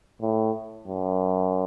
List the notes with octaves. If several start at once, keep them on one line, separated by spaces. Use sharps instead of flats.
A2
F#2